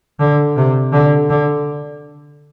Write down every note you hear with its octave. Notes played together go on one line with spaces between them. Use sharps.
D3
C3
D3
D3